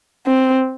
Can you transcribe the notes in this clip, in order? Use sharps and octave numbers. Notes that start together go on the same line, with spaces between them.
C4